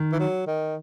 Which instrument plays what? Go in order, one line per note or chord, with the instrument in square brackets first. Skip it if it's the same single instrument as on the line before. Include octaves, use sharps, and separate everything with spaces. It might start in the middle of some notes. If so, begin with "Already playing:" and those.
Already playing: [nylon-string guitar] D#3
[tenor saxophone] E3
F#3
D#3